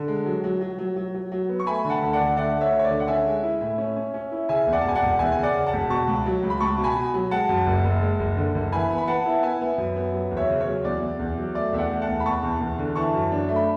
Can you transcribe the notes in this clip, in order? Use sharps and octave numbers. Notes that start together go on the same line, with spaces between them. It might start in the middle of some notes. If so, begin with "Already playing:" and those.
Already playing: D3
G#3
F#3
F#3
F#3
F#3
F#3
F#3
F#3
B3
C#6
A3 G#5 B5
D3
F#5 A5
D2
D5 F#5
D3
A3 D5 F#5
A3
C#5 E5
D2
C#5
D5
D3
F#5
C#4 E5 G#5
G#3
E4
A2
C#4
C#4
C#4
E4
C#3 E5 G#5
E2
D5 F#5
A5
E1 G#5
D5 F#5
E1
E2 E5 G#5
G#5
C#3
D5 F#5
C#3
F#5 A5
E1
B2 A5 C#6
C#2
F#3
C#2
B5
C#2 A5 C#6
B2
G#5 B5
B2
F#3
G#3 F#5 A5
F#2
F#1
F#1
G#3
F#1
D3
F#1
E3 G#5 B5
B3
B5
B3 F#5 A5
E4
B3 E5 G#5
B3
F#2
B3
F#3
E2
C#5 E5
C#3
C#5
F#3
E2 D5
E2
E2
F#3
A3 D5
E2 E5
D5 F#5
A3
F#5 A5
E2
B5
E2 A5 C#6
E2
E2
D3
E3 A5 C#6
F#2
D4
A3
B5